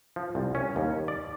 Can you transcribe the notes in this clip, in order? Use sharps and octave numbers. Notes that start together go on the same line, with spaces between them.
F3
C2
C#4
D#2
D5